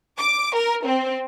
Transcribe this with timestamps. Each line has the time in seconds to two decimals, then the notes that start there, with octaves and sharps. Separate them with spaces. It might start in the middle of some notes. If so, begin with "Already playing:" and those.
0.18 D6
0.55 A#4
0.85 C4